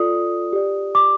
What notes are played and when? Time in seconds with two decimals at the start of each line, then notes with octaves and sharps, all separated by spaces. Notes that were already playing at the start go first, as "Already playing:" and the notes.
Already playing: F4 A4 D5 D#6
0.53 G4 D5
0.95 D6